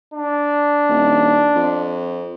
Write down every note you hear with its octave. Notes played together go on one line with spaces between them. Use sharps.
D4
D#1
F2